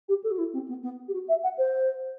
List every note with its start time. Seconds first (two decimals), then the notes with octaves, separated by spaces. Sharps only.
0.09 G4
0.24 A4
0.31 F#4
0.38 E4
0.53 C4
0.68 B3
0.83 B3
1.08 G4
1.13 F#4
1.28 E5
1.43 F#5
1.58 C5